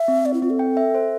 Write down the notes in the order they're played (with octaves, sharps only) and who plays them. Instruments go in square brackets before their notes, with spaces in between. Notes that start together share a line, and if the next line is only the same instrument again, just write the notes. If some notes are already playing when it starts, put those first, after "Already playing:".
Already playing: [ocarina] E5
[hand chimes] C4
[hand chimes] C4 [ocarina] D5
[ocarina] E4
[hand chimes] C4 [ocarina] F4
[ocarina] A4
[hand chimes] G5
E5
C5